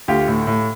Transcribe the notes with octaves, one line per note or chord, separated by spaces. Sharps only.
D2 F4 G4
A2
A2